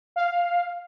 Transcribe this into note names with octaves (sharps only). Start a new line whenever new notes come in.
F5